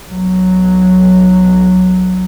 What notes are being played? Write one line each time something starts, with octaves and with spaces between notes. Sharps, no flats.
B1 F#3